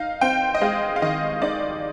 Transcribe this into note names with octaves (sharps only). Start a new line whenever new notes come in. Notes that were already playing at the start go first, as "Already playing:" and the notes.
Already playing: D#4 F5
C4 G5
D#5
G#3 F5
F5
D#3 D#5
D#4 D5